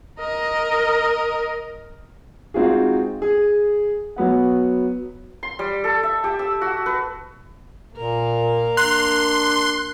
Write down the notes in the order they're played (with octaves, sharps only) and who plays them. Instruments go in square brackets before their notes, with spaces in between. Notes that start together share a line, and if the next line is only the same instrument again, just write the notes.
[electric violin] A#4 D#5
[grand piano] G#3 C4 D#4 F4 F#4 G#4
G#4
F#3 B3 F#5
[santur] C6
G3
A4
E5
G4
E6
F#4
B4
[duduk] A#2 [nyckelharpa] A#3 A#4
[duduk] D4 [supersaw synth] C6 [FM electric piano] F#6